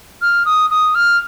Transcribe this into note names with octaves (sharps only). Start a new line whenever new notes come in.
F6
D#6
D#6
F6